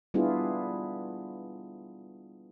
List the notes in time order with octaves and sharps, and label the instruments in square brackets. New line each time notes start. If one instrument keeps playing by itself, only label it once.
[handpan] G3 B3 D4 E4 F4 G#4